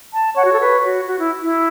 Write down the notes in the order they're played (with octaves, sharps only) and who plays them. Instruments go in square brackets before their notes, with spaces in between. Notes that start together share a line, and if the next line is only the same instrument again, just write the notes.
[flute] A5
[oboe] C#5 [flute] F#5
[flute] F#4
A4
B4
F#4
F#4
E4
E4